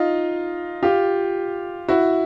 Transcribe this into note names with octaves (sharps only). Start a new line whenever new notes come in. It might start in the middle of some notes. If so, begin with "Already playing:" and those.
Already playing: D#4 F4
F4 G4
E4 F#4